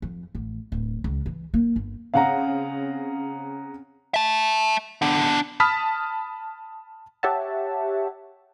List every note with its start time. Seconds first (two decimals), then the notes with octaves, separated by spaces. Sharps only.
0.02 F2
0.35 A1
0.72 D1
1.04 C#2
1.26 E3
1.54 A#3
1.76 G1
2.14 C#3 C4 C#4 F5 F#5 A#5
4.14 E5 A5
5.02 B3 D4
5.60 A5 B5 D#6 F6 B6
7.23 G4 C#5 E5 F#5 A5